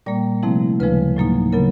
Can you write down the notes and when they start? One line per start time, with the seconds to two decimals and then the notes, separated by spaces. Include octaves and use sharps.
0.06 A#2 G3 A#3 D5
0.43 C3 F3 A3 C4 E4
0.80 D2 C#3 F3 G#3 B4
1.17 A2 F#3 A#3 D#4
1.53 C#3 F#3 B3 A#4